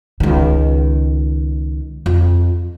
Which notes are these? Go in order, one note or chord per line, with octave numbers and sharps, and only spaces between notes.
C#2 D#3
F2